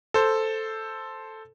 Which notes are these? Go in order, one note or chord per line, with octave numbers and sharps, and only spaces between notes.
A4 C5